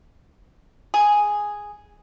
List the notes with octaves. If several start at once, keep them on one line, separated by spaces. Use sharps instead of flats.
G#4